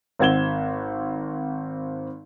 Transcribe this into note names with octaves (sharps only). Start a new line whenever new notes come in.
G#1 C4 F#5 G#6 E7 G7